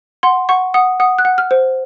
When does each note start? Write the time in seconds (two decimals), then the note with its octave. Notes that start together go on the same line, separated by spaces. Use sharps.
0.23 F#5 C6
0.49 F#5 C#6
0.74 F#5 D#6
1.00 F#5 D#6
1.19 F#6
1.25 F#5
1.38 F6
1.51 C5